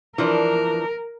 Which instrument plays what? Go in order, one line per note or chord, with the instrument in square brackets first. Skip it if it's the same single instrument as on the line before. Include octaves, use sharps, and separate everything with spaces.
[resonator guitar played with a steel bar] E3 F3 D4 [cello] A#4